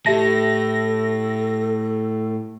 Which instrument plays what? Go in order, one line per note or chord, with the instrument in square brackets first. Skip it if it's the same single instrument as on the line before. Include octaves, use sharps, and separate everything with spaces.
[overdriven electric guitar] A2 [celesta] G4 E5 A5 [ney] A4 [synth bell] A#6